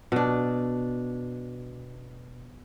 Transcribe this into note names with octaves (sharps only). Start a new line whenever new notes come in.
B2 D4